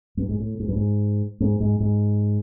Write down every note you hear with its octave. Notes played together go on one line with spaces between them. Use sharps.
G2
G#2
A2
G#2
G2
G#2
G#2
G#2
G#2